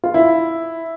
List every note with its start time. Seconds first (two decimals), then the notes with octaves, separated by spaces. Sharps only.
0.04 F4
0.14 E4